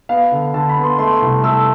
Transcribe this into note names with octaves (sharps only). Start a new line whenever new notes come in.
B3 F5
D3
D3 A5
B5
B3
C6
A3 C6
C2
A3 E6